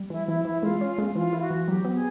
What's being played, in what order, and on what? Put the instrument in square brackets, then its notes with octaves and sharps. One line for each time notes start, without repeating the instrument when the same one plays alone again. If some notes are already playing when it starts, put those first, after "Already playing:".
Already playing: [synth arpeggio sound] G3
[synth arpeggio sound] E3 [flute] E4
[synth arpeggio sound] E3 [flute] E4
[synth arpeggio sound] E3 [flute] E4
[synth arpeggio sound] G#3 [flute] F4
[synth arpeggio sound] C#4
G#3
[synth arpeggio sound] E3 [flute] F4
[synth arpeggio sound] E4
[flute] F#4
[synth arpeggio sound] E3
[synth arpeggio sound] F#3 [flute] G4
[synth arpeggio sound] B3
[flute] G#4